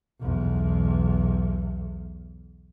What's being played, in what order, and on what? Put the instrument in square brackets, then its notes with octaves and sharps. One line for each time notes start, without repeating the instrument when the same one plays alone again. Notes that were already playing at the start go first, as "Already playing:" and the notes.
[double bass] B1 E2